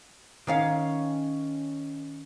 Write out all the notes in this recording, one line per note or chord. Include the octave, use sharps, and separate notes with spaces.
D#3 C#4 F5